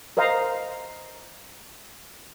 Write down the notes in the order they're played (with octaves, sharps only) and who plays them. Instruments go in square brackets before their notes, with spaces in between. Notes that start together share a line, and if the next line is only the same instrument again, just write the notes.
[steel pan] A#4 C5 D#5 F5 A#5